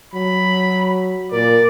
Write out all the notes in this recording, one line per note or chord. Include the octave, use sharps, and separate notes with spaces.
F#3 B5
A#2 A#4 D5